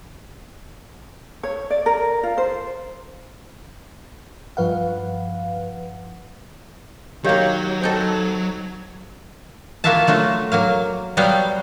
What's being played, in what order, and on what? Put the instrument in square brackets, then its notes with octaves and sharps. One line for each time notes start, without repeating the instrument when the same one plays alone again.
[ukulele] C#5
D5
A#4
F4
C5
[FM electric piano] G2 F3 B4 F5 F#5
[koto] D#3 A#3 [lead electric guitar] F#3 [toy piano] G4 C#5 F5
[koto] C4 D#4 A4 [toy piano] C5
[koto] A#3 F4 F#4 E5 F5 A5
F#3 A3 F4 F#4
F#3 A#3 F5
F#3 G3 B3 F5 G5